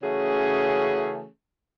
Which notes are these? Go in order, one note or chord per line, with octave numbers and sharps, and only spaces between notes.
C#3 E3 A3 C#4 F#4 G#4